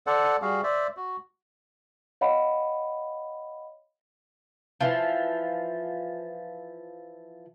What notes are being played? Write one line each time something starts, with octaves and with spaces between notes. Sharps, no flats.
A4 C5 D5 F#5
G3 F#4 G#4 F5
C5 D5 E5
F#4
C#5 D#5 F5 F#5 B5
E3 F3